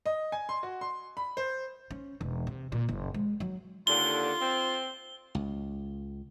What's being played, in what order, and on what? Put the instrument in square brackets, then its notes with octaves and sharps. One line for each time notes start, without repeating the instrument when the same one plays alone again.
[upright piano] D#5
G#5
C6
F#4
C6
B5
C5
[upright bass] C#4
E1
C3
A#2
F#1
G#3
F#3
[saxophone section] D#2 D3 [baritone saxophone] F4 [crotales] G7
[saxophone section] C4
[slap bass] C#2